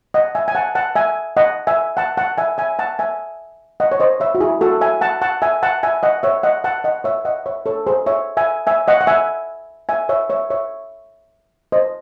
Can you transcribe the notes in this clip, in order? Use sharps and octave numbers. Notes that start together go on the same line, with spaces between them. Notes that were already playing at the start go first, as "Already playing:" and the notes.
D#5 F#5
E5 G#5
G#5
F#5 A5
F#5 A5
E5 G#5
D#5 F#5
E5 G#5
F#5 A5
F#5 A5
E5 G#5
E5 G#5
F#5 A5
E5 G#5
D#5 F#5
C#5
C5 D#5
C#5 E5
F#4
E4 G#4
F#4 A4
E5 G#5
F#5 A5
F#5 A5
E5 G#5
F#5 A5
E5 G#5
D#5 F#5
C#5 E5
D#5 F#5
F#5 A5
D#5 F#5
C#5 E5
D#5 F#5
C#5 E5
A4 C#5
G#4 C5
C#5 E5
E5 G#5
E5 G#5
D#5 F#5
F#5
E5 G#5
E5 G#5
C#5 E5
C#5 E5
C#5 E5
C5 D#5